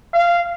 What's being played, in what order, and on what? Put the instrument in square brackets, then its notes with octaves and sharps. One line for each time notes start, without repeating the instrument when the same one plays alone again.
[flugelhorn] F5